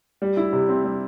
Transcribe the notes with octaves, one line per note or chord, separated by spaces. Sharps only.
G3
E4
C3
C4
G3